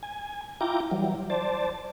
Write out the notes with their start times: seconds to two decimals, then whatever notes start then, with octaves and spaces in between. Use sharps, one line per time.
0.03 G#5
0.61 E4 F4 G5 A#5 D6
0.91 E3 F#3 G3
1.30 C5 D5 A5